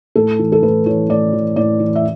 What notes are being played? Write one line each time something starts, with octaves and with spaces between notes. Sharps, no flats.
A2 A4
E3
A4
A2 B4
E3 C#5
A2 D5
E3
A2 D5
E3
E5